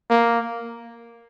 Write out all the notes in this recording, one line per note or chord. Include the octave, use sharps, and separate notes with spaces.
A#3